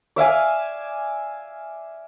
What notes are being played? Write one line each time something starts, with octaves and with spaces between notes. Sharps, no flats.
D5 E5 F5 G#5